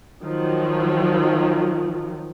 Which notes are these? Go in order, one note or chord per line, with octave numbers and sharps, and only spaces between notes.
D#3 F3 F#3